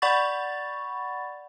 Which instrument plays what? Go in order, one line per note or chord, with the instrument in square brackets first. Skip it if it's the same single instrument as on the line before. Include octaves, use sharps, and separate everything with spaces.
[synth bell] D5 F#5 B5 C#6 A6